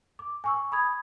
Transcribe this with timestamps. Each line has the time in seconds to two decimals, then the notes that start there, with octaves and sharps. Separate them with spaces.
0.19 D6
0.44 G#5 C#6 E6
0.72 B5 D#6 G#6